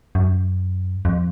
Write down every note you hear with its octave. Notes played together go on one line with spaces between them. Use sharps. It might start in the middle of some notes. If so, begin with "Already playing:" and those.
F#2
F2